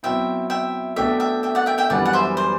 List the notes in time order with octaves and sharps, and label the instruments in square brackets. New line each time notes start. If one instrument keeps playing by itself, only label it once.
[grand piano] B2 F#3 C4 E4 [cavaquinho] E5 G5
[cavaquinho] E5 G5
[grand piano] B2 A3 D4 A4 [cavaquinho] E5 G5
[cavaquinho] E5 G5
E5 G5
D5 F#5
E5 G5
E5 G5
[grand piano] F#2 E3 G3 B3 D4 [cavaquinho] D5 F#5
[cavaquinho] F#5
C5 E5
C5